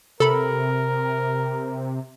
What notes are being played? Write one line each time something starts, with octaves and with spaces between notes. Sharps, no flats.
C3 A4 A#4 B5